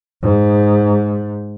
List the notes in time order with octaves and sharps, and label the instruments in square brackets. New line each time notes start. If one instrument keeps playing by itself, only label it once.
[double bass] G#2